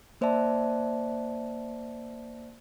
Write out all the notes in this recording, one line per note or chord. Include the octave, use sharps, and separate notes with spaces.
A#3 C5 D5 E5 A5